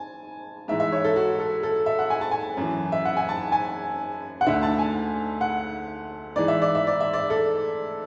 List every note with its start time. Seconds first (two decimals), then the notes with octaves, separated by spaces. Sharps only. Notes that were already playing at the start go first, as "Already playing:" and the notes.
Already playing: G#5 A5
0.68 G#2 E3 E5
0.80 E5
0.92 C#5
1.04 A4
1.16 F#4
1.39 A4
1.63 A4
1.86 E5
1.99 F#5
2.10 G#5
2.21 A5
2.31 G#5
2.57 F#2 E3
2.92 E5
3.05 F#5
3.17 G#5
3.29 A5
3.52 G#5
4.41 F#5
4.47 D2 D3 E5
4.63 A5
4.79 G#5
5.41 F#5
6.36 G#2 E3 D5
6.48 E5
6.62 D5
6.75 E5
6.87 D5
7.01 E5
7.14 D5
7.30 A4